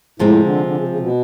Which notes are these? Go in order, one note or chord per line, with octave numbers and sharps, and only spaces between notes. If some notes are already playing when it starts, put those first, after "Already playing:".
A2 C3 F3 G#3 C4
D3
D3
C#3
C#3
B2